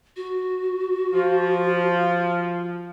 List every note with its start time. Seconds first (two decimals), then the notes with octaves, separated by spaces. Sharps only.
0.16 F#4
1.13 F3